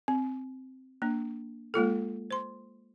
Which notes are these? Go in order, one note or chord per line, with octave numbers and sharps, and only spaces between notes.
C4
A#3 D4
G#3 A#3 F4 A4
C5 C6